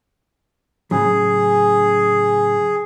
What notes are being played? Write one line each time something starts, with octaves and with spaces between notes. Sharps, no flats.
A2 C#3 F#3 G#4